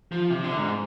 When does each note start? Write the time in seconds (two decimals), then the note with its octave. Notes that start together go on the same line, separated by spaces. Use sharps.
0.12 F3
0.30 C3
0.44 D3
0.57 G#2